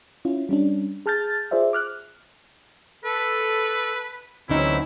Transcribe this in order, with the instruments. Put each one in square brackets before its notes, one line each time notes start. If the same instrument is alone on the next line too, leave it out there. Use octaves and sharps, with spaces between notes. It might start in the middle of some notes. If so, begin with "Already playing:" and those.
[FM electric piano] C#4 E4 F4
G3 C#4 D4
G#4 A5 F6 G6 A6
F4 G#4 C5 D5 E5
D6 F6 F#6
[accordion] A4 [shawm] B4
[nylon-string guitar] D2 C#4 D#4 [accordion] E3 F#3 C4 [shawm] E4